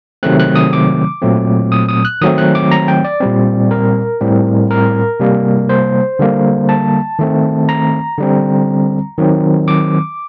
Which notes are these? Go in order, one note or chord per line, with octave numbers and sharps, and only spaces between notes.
C3 D#3 F#3 A3 C4 F#6
F#6
D#6
D6
A#2 F#3 A3 C4
D#6
D#6
F#6
D#3 F#3 A3 C4 D#6
F#6
D6
A#5
G5
D5
A#2 G3 C4
A#4
A2 G3 C4
A#4
C3 G3 A#3
C5
D3 G3 A#3
A5
D#3 A3 C4
A#5
D3 G3 C4
D#3 F#3 C4
D6